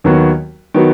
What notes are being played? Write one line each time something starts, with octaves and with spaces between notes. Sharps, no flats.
D#2 D#3 F#3 B3 F#4
D#3 F#3 B3 F#4